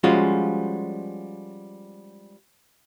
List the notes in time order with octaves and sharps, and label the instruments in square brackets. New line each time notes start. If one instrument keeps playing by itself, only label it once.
[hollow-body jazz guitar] F3 G3 G#3 C#4 F4 F#4